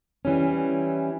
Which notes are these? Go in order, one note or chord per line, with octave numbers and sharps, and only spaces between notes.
E3 G3 C#4